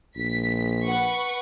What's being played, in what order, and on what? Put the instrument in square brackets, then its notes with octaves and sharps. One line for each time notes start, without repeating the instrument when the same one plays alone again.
[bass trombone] A#1 [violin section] B6
[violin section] B4 F#5 C#6